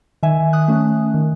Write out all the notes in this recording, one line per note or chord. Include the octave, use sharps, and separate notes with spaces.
D#3 E5 G#5
D#6 F#6
A3 C#4
D#3